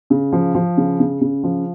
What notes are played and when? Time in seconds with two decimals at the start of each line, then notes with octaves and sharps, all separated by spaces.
0.10 C#3
0.33 F3
0.55 F3
0.77 C#3
1.00 C#3
1.21 C#3
1.43 F3